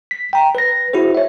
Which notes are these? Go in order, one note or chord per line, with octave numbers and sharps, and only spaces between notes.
B6
G5 A#5
B4 A#6
E4 F#4 G#4 C5
C#5 E5